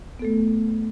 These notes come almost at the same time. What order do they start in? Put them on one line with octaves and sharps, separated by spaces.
B3 A4 A3